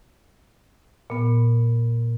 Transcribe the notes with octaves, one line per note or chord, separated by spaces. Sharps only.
A#2 B3